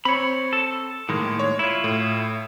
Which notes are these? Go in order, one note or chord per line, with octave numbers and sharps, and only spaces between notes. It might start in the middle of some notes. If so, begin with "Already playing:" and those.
C4 C#5 B5
A4
A2 D#3 G#3 A#3
C#5
E4 F4 C#5
A2